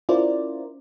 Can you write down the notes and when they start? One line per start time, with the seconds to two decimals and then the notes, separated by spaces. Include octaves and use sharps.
0.09 C#4 E4 F4 A#4 C5 D5